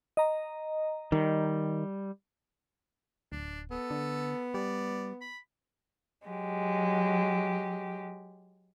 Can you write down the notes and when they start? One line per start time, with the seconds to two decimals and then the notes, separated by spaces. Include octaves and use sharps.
0.17 D#5 A#5
1.12 D#3 G3
3.32 D1 D4
3.71 B3 A4
3.91 D3
4.54 G3 D5
5.21 B5
6.27 F#3 G#3 G4